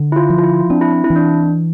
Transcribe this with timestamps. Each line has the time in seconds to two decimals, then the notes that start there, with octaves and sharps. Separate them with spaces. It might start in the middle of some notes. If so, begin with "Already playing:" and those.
Already playing: D3
0.12 E4
0.16 F4
0.30 F3
0.38 F4
0.43 E4
0.70 C4 D4
0.81 E4
0.93 D4
1.04 E4
1.10 E3
1.16 D4